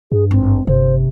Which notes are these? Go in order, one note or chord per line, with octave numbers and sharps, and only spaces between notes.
G2 G#4
G#1 C4
G1 C3 C5